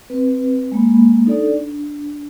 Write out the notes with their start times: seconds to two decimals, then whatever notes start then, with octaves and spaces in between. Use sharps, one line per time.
0.10 C4 B4
0.72 G#3 A#3 B5
1.26 D4 D#4 A4 D5
1.57 D4